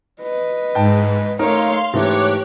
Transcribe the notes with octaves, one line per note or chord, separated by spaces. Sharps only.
B4 D#5
G#2 G5 A5
A3 D#4 A#4 C#5 F5 C6
G#2 E3 A3 G4 C#5 D6 F#6